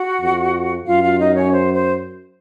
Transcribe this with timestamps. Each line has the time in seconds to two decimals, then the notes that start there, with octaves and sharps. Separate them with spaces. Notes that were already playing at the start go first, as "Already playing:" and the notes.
Already playing: F#4 F#5
0.21 F2
0.86 F#2 F4 F5
1.02 F4 F5
1.19 D#4 D#5
1.35 C#4 C#5
1.53 C5
1.74 C5